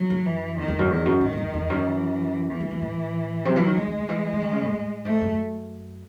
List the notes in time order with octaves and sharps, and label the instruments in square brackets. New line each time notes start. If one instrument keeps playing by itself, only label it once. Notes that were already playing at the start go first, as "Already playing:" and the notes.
Already playing: [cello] F#3
[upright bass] F#2
[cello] E3
[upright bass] E2 [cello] D#3
[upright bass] E2
F#2
[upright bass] E2 [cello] D#3
[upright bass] F#2
[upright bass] G#2 [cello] D#3
[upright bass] F#2
E2
E2
F#2
[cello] E3
[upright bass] E2 [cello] E3
[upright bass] F#2
F#2
A2
[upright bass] C3 [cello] F#3
[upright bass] E3
D#3
[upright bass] D#3 [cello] G#3
[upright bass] D#3
D#3
E3
E3
D#3
C#3
A2
A2
[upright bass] G#2 [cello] A3
[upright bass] F#2